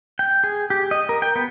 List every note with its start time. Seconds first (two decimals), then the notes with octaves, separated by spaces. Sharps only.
0.19 G5
0.44 G#4
0.70 G4
0.91 D#5
1.09 A#4
1.22 G5
1.36 B3